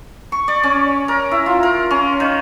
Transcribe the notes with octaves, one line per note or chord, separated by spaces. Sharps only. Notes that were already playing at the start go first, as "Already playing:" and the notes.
C#6
D5
C#4
A#4
E4
F4
A#4
C#4
D#3